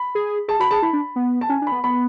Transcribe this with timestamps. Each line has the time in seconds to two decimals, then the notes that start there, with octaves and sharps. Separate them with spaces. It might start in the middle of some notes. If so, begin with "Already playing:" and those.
Already playing: B5
0.15 G#4
0.48 G#4 A5
0.60 F#4 B5
0.71 G#4 A5
0.82 E4 B5
0.93 D4
1.16 B3
1.41 A5
1.49 C#4 G#5
1.62 D4
1.67 B3 B5
1.84 B3 B5